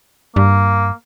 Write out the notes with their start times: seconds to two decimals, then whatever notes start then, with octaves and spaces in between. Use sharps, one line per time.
0.36 G2 A#3